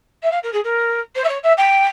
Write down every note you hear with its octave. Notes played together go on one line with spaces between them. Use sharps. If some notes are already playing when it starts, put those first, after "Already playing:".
E5
F5
A#4
G#4
A#4
C5
E5
C#5
E5
G5